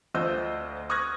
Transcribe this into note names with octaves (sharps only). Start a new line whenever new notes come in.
D2 F4 C5 D#5 E6 G6
C#6 D#6 F6 F#6 G#6 A#6